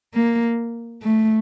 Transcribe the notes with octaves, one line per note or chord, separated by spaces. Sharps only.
A#3
A3